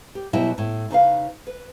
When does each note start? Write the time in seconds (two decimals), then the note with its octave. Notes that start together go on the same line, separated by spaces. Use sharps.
0.15 G4
0.33 B2 F#3 G3 E4 D#5 G5
0.58 A2
0.91 C#3 D#4 B4 F5
1.47 B4